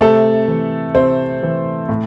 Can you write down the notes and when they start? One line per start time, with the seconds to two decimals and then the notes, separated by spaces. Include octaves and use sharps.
0.01 C3 A3 A4
0.48 E3
0.95 C3 C4 C5
1.43 E3
1.89 A2